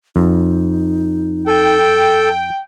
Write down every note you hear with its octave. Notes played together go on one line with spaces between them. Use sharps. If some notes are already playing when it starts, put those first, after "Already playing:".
F2 D#4
A4 G5